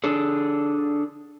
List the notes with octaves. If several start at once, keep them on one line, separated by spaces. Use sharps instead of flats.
D4 G#4 A4